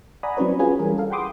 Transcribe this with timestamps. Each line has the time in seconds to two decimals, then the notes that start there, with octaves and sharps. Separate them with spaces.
0.23 D5 F#5 G#5 A#5 B5 D#6
0.37 F#3 C4 C#4 E4 B4 C#5
0.59 C#4 F4 F#4 G#4 B4 G#5
0.79 E3 G3 G#4 A#4
0.98 A4 F5
1.10 F#5 G5 B5 C6 D6 D#6